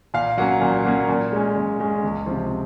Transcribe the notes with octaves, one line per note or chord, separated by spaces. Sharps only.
A#2 F5
F#3 A#3 C#4 F#5
A#2
F#3 A#3 C#4
A#2
G#3 C#4
A#2
G#3 C#4
C#2
C3 F3